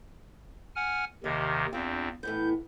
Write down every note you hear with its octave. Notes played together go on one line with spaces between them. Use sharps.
F#5 G#5 F6
D#2 C3 D#3 D#5
E2 C4 D4 F4
A2 E3 B3 G6